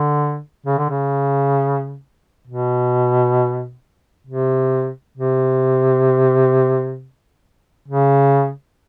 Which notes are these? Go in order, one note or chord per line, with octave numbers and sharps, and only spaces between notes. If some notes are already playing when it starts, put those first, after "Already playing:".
Already playing: D3
C#3
D3
C#3
B2
C3
C3
C#3